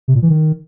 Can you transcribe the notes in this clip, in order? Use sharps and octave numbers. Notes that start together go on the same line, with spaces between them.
C3
A#2
E3
D#3